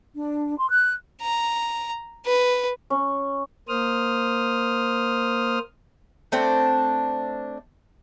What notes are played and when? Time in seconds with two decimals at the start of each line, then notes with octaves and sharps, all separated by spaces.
0.16 D4
0.57 C6
0.69 F#6
1.22 A#5
2.26 B4
2.90 C#4
3.68 A#3 C5 D#6 F6
6.32 A3 C4 D4 C5